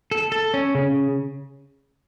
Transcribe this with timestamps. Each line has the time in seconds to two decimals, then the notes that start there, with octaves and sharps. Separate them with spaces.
0.11 A4
0.32 A4
0.54 C#4
0.75 C#3